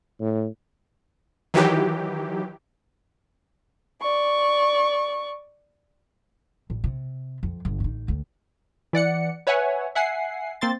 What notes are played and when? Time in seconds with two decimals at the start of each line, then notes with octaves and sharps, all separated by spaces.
0.20 A2
1.54 D#3 E3 F#3 G4
4.02 D5 C#6
6.70 A1
6.84 C3
7.43 F2
7.65 G1
7.80 A1 D#4
8.08 D2
8.93 E3 D5 F#5 C#7
9.47 B4 C#5 E5 F#5 G#5
9.95 E5 F#5 G#5 C7
10.61 A#3 C4 C6 A6